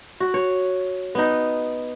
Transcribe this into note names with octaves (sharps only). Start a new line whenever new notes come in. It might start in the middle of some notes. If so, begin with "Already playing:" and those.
F#4
C#5
B3 D#4